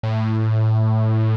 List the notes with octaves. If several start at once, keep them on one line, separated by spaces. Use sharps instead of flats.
A2